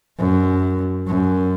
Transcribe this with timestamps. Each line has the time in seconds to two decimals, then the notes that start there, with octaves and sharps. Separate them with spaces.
0.18 F#2
1.07 F#2